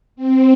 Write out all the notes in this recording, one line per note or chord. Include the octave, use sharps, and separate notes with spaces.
C4